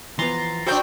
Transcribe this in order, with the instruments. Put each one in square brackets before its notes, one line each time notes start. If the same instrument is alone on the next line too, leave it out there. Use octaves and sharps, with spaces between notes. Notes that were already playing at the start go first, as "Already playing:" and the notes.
[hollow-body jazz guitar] E3 F3 B3 [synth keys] A#5 C6 A6
[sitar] C4 D4 [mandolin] F#4 G5 E6